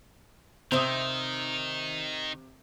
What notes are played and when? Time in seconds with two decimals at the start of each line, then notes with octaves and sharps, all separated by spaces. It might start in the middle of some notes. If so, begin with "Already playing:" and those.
0.72 C3 D#3 C4 C5 E5 D#6